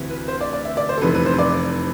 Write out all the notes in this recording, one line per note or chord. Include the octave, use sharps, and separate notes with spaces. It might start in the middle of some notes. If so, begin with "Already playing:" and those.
Already playing: D2 C3 E3
B4
C5
D5
D5
E5
D5
C5
A4
F1 E2 C3 B4
B4
C5
D5